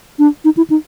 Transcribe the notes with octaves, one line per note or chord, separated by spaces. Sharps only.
D4
D#4
E4
D#4